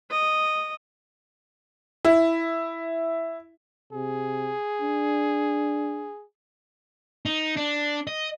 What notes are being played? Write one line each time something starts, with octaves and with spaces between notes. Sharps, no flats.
D#5
E4
C3 G#4
D4
D#4
D4
D#5